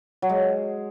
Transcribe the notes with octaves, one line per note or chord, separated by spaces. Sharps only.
F#3
G#3